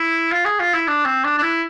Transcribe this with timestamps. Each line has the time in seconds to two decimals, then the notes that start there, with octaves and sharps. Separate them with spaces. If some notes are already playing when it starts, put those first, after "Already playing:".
Already playing: E4
0.32 F4
0.45 G#4
0.60 F4
0.74 E4
0.88 D4
1.05 C4
1.24 D4
1.38 D4
1.42 E4